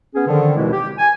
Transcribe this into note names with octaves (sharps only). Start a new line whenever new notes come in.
B3 C#4 G#4
D3 D#3 F3
D#2 B2 E3 G#3 C4 E4
G4
G#5